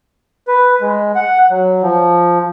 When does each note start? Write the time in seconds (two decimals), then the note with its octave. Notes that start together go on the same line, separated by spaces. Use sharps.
0.48 B4
0.81 G#3
1.15 F#5
1.51 F#3
1.83 F3